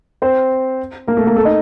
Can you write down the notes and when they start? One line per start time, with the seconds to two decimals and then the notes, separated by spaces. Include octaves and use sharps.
0.22 C4 C5
1.07 A#3 A#4
1.17 A3 A4
1.27 A#3 A#4
1.36 A3 A4
1.45 D#4 D#5